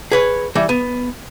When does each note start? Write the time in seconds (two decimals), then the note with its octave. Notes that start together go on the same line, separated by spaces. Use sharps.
0.12 G#4 B4 C#5
0.55 E3 G3
0.69 B3